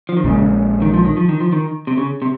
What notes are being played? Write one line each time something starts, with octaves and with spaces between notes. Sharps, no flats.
F3
D#3
A#1 A#2 C#3 G#3 C#4
D#3
F3
D#3
F3
D#3
F3
D#3
C3
C#3
C3